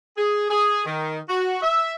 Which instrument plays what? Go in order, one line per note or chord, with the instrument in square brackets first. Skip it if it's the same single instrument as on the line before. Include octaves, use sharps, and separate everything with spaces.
[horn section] G#4
G#4
D#3
F#4
E5